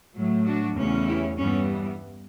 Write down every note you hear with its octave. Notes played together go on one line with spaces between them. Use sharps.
A2 F#3 A3
D4 F#4
E2 C#3 E3 A3 C#4
E4 G4
G2 E3 G3 B3 C#4